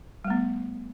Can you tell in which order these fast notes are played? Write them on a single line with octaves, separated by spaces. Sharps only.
G3 A3 B3